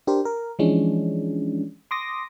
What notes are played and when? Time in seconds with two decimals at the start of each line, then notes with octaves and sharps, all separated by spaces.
0.07 D4 G4 A#4 C5
0.25 A#4
0.59 E3 F3 G#3 C#4 D4
1.91 C6 D6 D#6 A#6